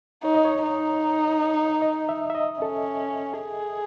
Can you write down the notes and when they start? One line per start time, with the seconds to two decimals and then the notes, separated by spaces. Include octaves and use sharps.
0.23 D#4 C#5
0.35 D#5
0.45 C#5
0.63 D#4
1.82 D#5
2.09 E5
2.30 E5
2.35 D#5
2.62 C#4 A4
3.41 G#4